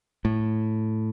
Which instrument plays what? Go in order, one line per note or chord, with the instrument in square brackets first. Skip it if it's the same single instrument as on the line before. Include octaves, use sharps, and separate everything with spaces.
[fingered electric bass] A2